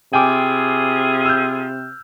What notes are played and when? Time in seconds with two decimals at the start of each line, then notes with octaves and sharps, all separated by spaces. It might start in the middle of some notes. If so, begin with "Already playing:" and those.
0.13 C3 E4 F4 G#4 G5 G#5 D6
1.26 E6 F6 G6